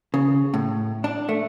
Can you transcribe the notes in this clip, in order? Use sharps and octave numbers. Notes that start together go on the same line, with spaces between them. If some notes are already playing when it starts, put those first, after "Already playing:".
C#3
A2
D4
A3